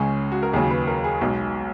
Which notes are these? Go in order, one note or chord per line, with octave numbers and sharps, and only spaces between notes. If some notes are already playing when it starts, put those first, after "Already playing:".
Already playing: C#2 C#3 G#3 C#4
F#4
A#4
D#2 C#3 F#3 G#4
B4
A#4
G#4
B1 B2 G#3